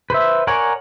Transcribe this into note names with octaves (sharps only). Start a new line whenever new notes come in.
B4 C5 E5
A#4 C#5 D5 F#5 G#5